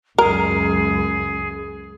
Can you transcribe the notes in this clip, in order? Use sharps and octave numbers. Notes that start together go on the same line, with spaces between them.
C#2 F#2 G#4 A#4